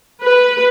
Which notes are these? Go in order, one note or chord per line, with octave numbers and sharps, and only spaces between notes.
B4